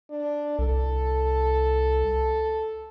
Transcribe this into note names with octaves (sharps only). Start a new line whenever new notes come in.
D4
C2 A4